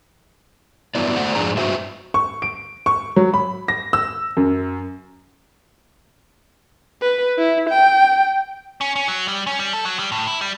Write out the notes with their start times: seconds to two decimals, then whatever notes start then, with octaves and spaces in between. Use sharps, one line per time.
0.95 G2 F#3 B3 E4 D5
1.16 A3 C5 D5 F#5
1.35 F2 G#2 D4 G#4 A#5
1.57 G2 F#4 C5 E5
2.14 C#6
2.42 D7
2.86 C#6
3.16 F#3
3.34 B5
3.68 A#6
3.93 E6
4.37 F#2
7.02 B4
7.38 E4
7.69 G5
8.81 C#4
8.96 C#4
9.08 F#3
9.28 G3
9.47 C#4
9.59 G3
9.73 A4
9.85 F#3
9.99 G3
10.12 A2
10.27 E4
10.41 G3